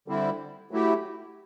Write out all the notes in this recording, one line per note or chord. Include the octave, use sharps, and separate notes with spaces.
D3 G3 C4 E4
F#3 A3 E4 G4